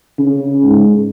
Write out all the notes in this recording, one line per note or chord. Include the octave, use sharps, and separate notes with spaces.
C#3
G#2